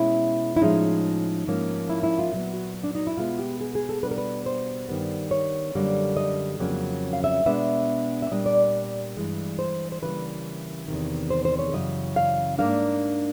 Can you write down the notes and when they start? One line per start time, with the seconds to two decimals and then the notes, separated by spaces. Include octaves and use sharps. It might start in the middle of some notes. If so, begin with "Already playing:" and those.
Already playing: B2 G#3 C#4 E4
0.56 E4
0.61 A2 F3 G#3 C#4 D#4
1.47 G#2 F3 A#3 C#4
1.89 E4
2.03 E4
2.19 F4
2.32 A#2 F#3 B3
2.53 F#4
2.84 D4
2.95 D#4
3.07 E4
3.17 B2 G#3 B3 F4
3.39 G4
3.61 G#4
3.75 G#4
3.89 A4
4.03 B2 G3 B3 D4 B4
4.11 A#4
4.18 B4
4.46 C5
4.89 G2 D#3 G3 B3
5.31 C#5
5.75 F#2 D3 G3 A#3
6.17 D#5
6.59 F2 C#3 F#3 A#3 C#4
7.13 F5
7.24 E5
7.45 B2 G#3 B3 D4 E5
8.22 E5
8.31 A#2 G3 A#3 D4 D#5
8.46 D5
9.17 G2 E3 G#3
9.59 C5
9.92 C5
10.02 C#3 E3 G3 A#3 B4
10.88 E2 C3 D#3
11.30 C5
11.45 C5
11.59 C#5
11.73 F#2 C#3 E3 D#5
12.16 F5
12.58 G#2 F3 A#3 D4 F5